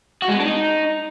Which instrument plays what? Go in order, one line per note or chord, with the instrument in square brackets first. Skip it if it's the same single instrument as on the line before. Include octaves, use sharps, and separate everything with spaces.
[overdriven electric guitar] F#4
G#3
B3
D4
D#4